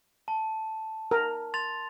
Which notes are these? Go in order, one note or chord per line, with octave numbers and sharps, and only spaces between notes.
A5
A#4
C6 A6 F7